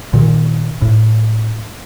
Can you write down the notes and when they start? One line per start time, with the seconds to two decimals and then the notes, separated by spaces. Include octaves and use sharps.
0.14 A#2 D#3
0.82 A2